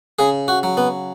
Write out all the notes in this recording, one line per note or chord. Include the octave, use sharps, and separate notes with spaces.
C#3 G#4
F#4
F#3
B3